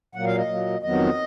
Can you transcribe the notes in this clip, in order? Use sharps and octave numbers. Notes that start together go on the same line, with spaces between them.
A#2 F#3 A#3 F#5
F5
D#5
A#2 F#3 A#3
F2 D#3 F#3 B3 D#5